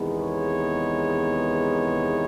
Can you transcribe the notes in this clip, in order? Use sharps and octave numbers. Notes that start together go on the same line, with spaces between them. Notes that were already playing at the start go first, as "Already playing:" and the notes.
Already playing: E2 C3 D#3 G#3 B3
C#5